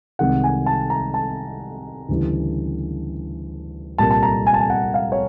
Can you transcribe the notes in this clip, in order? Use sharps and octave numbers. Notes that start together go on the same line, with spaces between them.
C2 C3 D#3 G#3 F#5
G#5
A5
A#5
A5
D2 C#3 E3 G3
C2 A#2 G3 A#3 A5
A5
A#5
G#5
A5
G#5
F#5
F5
C#5